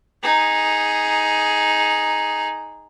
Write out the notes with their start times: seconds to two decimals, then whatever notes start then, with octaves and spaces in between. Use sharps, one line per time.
0.23 D#4 G#4